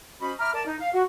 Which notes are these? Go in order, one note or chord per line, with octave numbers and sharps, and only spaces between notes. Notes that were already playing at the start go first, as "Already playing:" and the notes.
C#4 F#4 C5 D#5 B5
E5 A#5 B5 D6 F6
A#4 D5 A5
D#4
F5
F#4